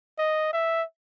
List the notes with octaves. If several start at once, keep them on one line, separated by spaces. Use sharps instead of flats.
D#5
E5